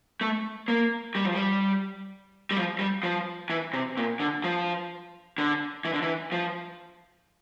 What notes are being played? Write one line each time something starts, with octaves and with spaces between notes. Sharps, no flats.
A3
A#3
G3
F3
G3
G3
F3
G3
F3
E3
C3
A#2
D3
F3
D3
E3
D3
E3
F3